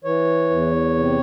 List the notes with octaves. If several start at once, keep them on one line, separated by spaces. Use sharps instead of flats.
E3 C#5
E2
C3